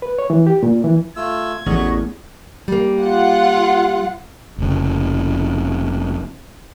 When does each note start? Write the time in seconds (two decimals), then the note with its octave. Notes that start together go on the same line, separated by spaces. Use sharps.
0.02 B4
0.19 C#5
0.30 E3
0.47 G4
0.63 A#2
0.84 E3
1.16 A3 F4 E6 G#6
1.66 A1 E2 A3 F#4 D#5 C#6
2.68 G3 A#3
3.01 F4 F#5
4.58 F1 C#3